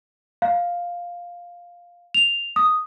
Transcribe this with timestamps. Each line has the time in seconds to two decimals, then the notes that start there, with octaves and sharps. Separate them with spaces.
0.42 F5
2.14 F7
2.56 D#6